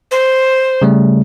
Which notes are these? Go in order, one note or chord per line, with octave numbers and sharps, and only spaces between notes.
C5
C#3 G3 A3